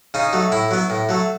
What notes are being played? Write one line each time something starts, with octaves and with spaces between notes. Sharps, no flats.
C#3 D#4
F#3 A3
A2 E4
F#3 B3
A2
F#3 A3